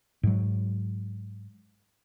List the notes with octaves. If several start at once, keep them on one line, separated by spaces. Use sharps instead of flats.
G#2 F#3